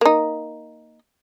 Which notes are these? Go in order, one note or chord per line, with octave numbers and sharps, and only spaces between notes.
A#3 D#4